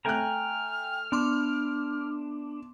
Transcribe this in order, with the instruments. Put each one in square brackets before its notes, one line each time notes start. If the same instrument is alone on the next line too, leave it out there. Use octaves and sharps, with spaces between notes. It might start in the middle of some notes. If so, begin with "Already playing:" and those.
[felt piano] A3 F#6 [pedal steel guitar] G5 G#5 A#5 [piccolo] F6
[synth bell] B3 C6 D6 [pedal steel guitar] D4